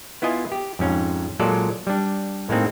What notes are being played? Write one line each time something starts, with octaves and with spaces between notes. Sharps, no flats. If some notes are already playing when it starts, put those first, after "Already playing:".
B3 E4 F4 D#5 G#5
G4
F2 G#2 C#4
A#2 F#3 G#3 F4 A4 D5
G3 D4
A2 G#3 A#3 C4 D#4